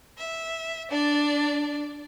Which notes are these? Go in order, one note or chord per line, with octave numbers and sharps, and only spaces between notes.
E5
D4 D5